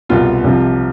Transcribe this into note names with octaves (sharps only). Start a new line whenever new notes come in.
C2 B2 F4
C2 C3 F3